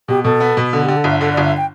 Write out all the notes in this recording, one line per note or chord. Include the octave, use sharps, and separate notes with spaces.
B2 G4
B2 A4
B3
B2
D3 A4
G4
D3
A4
G1 E5
D3 A4
D5
G1
E5
G5